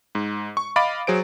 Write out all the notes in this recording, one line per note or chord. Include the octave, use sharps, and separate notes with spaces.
G#2
C#6
D#5 F5 B5 D6 A6 D7
F#3 G#4 C5 D7